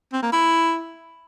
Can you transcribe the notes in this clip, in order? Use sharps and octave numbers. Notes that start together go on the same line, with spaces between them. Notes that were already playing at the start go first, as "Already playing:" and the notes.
C4
A#3
E4